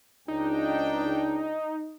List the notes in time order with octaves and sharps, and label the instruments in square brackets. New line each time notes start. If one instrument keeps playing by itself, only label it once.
[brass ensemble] C#2 D4 G5 [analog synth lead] D#4